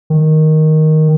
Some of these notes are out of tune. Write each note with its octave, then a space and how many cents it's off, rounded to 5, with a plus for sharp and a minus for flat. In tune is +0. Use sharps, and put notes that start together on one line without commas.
D#3 +5